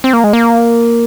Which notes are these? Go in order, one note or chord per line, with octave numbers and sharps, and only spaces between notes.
C4
A#3
G#3
A#3